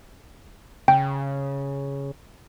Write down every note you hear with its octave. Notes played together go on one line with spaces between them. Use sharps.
C#3 G5